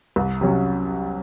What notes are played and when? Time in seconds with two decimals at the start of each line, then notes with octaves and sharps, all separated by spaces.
0.16 C2
0.41 C3 F#3 C#4